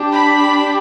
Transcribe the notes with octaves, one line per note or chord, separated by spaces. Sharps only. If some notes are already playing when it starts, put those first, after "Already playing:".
Already playing: D4 G4
B5